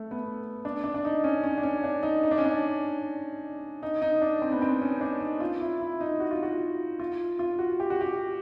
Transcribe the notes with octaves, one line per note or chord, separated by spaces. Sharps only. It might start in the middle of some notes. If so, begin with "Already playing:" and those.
Already playing: A3
B3
D4
D4
D4
D#4
C#4
C#4
D4
C#4
D4
D#4
D#4
D4
C#4
D4
D#4
D#4
D4
C4
B3
C4
C#4
D4
D#4
F4
E4
E4
D#4
F#4
F4
F#4
F4
F4
F#4
G4
F#4
G4